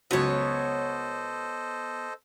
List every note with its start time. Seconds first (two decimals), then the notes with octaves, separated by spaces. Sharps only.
0.11 C#2 F#3 B3 F#4 A4 C5 C#5 D#5